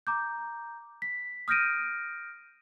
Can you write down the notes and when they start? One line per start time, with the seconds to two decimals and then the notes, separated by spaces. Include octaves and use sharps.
0.07 A#5 D6 G6
1.02 B6
1.48 D#6 F6 G6 A#6 D7 D#7